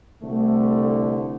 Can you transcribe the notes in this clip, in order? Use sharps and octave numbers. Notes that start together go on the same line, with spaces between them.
C2 D3 A3